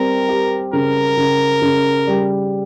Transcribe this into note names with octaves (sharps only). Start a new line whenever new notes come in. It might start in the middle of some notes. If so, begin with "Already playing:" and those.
Already playing: G3 C4 A#4
G4
C#3 A#4
C#3
C#3
G3